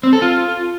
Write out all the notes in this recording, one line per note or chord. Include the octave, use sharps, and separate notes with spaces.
C4
A4
F4